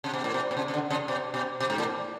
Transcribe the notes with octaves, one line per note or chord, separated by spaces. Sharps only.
C3
B2
A2
B2
B2
C3
C3
D3
C3
B2
B2
B2
G#2
A2